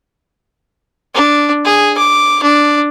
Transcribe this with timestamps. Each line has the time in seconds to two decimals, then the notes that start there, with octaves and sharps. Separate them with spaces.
1.15 D4
1.65 G#4
1.97 D6
2.43 D4